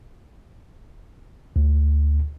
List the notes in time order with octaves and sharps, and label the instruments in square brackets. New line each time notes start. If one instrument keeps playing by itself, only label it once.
[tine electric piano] D2